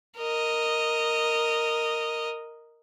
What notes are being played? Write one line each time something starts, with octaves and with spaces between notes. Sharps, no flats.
A#4 D#5